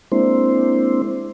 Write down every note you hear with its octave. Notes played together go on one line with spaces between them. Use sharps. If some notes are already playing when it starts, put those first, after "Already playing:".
G#3 A#3 C4 D4 E4 C5